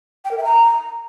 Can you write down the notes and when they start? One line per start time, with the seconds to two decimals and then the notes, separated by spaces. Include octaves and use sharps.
0.25 G5
0.31 A#4
0.38 E5
0.44 A#5